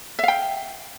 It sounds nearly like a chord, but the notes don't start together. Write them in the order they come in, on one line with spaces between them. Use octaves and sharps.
E5 F5 G5